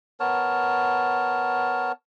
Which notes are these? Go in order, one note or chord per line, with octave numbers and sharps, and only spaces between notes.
B3 A#4 C#5 A5